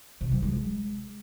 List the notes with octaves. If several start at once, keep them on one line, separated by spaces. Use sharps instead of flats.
C3
F#3
G#3